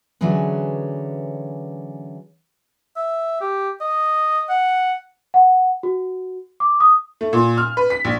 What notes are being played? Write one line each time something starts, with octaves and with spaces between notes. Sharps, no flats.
D3 E3 F#3 C#4 G#4 B4
E5
G4
D#5
F#5
F#5
F#4
D6
D#6
A3
A#2
F6
B4
B6
A#1